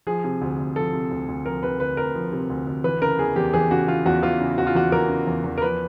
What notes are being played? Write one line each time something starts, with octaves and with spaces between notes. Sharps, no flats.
F3 G#4
C3
D2
D2
F3 A4
C3
D2
D2
F3 A#4
C3 B4
D2 B4
D2 A#4
F3
C3
D2
D2
E3 B4
C#3 A#4
E2 G#4
E2 G4
E3 G#4
C#3 F#4
E2 F4
E2 F#4
E3 F4
C#3
E2 F#4
F4
E2 F#4
E3 A#4
C#3
E2
E2
A#4
F3 B4